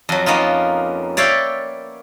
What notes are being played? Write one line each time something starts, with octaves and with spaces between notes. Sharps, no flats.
F2 F#3
A#3 B3 C#4 D#4 F4
C#5 D5 E5 F5 G5